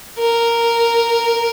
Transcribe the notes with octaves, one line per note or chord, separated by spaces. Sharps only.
A#4